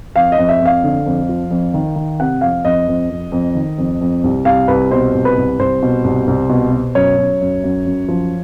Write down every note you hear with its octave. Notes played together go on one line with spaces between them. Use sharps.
F2 F5
D#5
F2
E5
F2
F5
D3
F2
F3
F2
D#3
D#3
C3 F#5
F2 F5
F2 D#5
F2
F2
F2
D#3
F2
F2
C2
C2 F5
C2 B4
B2 C5
C2
B4
C2
C2 C5
B2
C2
C2
B2
B2
F#2 C#5
F#2
F#2
F#2
F#2
F3